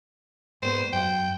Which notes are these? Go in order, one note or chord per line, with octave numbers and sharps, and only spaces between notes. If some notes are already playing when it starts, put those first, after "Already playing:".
G#2 B3 C5
F#2 G5